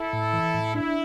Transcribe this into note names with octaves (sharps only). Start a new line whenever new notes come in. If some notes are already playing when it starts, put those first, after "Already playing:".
Already playing: E4 A4
A2
E3
A2
D4 E4